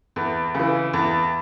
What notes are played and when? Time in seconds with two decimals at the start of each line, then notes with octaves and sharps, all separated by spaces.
0.16 E2
0.54 C#3 E3
0.93 E2